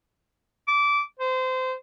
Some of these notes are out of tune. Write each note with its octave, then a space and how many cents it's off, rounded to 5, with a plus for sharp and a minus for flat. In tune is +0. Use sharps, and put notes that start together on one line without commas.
D6 -20
C5 -25